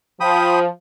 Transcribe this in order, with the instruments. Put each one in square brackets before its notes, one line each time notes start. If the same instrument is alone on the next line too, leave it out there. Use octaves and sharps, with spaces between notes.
[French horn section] F3 [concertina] G5 B5 D#6